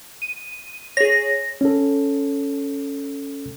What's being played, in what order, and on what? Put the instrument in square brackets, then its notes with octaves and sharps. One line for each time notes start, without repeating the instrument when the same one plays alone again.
[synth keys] D#7
[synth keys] G#4 C#5 [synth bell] A#6
[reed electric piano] C#4 A4